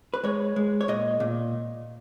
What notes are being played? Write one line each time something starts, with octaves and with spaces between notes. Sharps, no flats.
B4
G#3 C#5
G#3
C#5
A#2 D#5
A#2